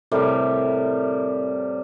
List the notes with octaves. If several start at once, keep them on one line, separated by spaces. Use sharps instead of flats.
A2 C3 G3 A#4